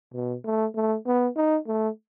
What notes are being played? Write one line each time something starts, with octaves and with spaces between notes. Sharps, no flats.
B2
A3
A3
B3
D#4
A3